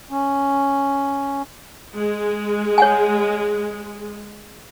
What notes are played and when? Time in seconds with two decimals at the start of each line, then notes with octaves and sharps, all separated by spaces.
0.11 C#4
1.95 G#3
2.78 C#5 F#5 G#5